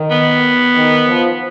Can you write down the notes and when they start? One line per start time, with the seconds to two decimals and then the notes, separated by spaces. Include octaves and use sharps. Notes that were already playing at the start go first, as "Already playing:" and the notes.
Already playing: D#3
0.11 B3
0.75 D#3
1.06 F3